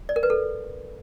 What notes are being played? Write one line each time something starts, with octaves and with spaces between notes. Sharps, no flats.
D5
A#4
B4
A4